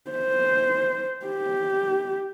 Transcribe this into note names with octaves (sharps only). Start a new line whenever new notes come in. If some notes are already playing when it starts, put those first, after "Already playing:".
C5
G4